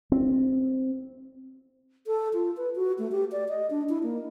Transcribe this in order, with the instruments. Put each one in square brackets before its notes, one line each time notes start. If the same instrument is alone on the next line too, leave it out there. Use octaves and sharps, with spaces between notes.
[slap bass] C4
[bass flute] A4
F4
B4
F#4
A3
G4
D5
D#5
D4
E4
A#3